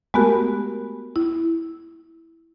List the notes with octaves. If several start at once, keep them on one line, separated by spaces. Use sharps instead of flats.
G#3 A3 B3 F#4 G4 A#4
E4